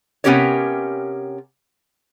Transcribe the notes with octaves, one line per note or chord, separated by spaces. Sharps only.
C3 B3 C#4 G4 A#4 C#5